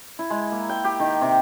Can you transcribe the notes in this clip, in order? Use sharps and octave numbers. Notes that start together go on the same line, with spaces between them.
E4
G#3
A#3
G5
G4
D#3
C3